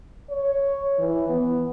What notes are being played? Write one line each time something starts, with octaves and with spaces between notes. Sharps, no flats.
C#5
E3
B3